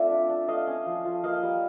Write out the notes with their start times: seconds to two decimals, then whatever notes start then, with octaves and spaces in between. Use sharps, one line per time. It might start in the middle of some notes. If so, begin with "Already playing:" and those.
Already playing: A3 C4 F4 D5 E5
0.11 D4
0.29 D4
0.48 A3 D#5 F5
0.67 C#4
0.86 F3
1.05 F3
1.24 A#3 D#5 F5
1.43 G3